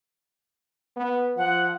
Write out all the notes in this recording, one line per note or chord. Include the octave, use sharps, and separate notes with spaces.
B3
F3 F#5